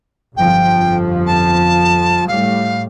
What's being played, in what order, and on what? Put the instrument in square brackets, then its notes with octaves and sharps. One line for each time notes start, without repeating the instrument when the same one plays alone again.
[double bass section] G1 F2 F3 [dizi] G5
[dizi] A5
[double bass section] A2 G3 [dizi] F5